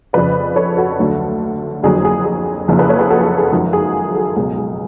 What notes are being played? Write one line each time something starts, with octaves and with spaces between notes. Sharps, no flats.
F2 C#3 F3 B4 D5
A4 C#5
F#4 A4
D2 D3 F#3
F#1 F2 D3 F#3 G#4
G#4
G#4
F#1 F2 C#3 F3
G#4 B4
A4 C#5
G#4 B4
F#4 A4
G#4
G#4
G#1 F#2 F3 F#4
G#4
F#4 A4
C#2 B2 F#3 G#4
G#4